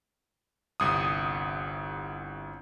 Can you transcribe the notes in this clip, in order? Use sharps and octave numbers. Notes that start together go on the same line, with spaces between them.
G1 C2 D#6